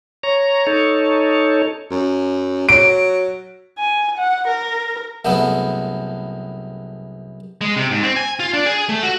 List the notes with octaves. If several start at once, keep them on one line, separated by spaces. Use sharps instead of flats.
C#5 A#5
D#4 A4 C#5
F#2
F#3 D7
G#5
F#5
A#4
C2 F#2 G#3 A3 B3
G#3
C3
G#2
C4
G#5
F4
D4
G#4
A3
F#4